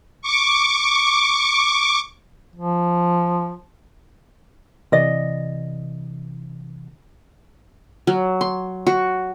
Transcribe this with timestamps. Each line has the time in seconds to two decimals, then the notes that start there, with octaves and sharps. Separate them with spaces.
0.22 C#6 D6
2.56 F3
4.92 C3 E3 D5 D#5
8.07 F#3
8.41 C6
8.87 F#4